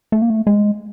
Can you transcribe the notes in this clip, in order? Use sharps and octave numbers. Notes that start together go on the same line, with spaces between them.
A3
A#3
A3
G#3